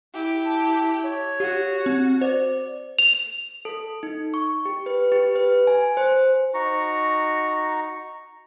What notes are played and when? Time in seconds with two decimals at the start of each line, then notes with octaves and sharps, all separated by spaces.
0.14 E4 G4
0.45 A5
1.04 C#5
1.40 F#4 G4
1.86 C4
2.21 C5 D5
2.99 F7
3.65 A4
4.03 D#4
4.34 C#6
4.65 G4
4.86 B4
5.12 G4
5.35 B4
5.67 G#5
5.97 C5
6.54 D#4 F#4 A#5 C#6